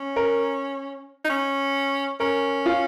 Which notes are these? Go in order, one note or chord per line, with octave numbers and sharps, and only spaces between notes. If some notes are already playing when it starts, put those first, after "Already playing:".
Already playing: C#4
A#4
D#4
C#4
C#4 A#4
F4